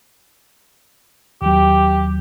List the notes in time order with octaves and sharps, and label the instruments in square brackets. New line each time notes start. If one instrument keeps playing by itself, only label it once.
[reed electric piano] D#2 F#3 [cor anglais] G4